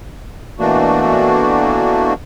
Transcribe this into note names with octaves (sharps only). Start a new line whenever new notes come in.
B2 E3 A3 A#3 D4 F#4